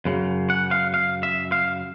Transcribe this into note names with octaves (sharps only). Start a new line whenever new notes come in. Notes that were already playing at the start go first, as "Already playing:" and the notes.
F#2 C#3
F#5
F5
F5
E5
F5